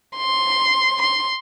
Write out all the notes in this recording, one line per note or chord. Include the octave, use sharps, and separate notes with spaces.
C6
C6